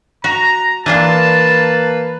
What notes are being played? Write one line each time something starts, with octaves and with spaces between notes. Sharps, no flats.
F#4 A#5
E3 A#3 D4 F4 B4 A5